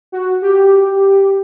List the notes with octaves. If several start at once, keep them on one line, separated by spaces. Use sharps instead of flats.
F#4
G4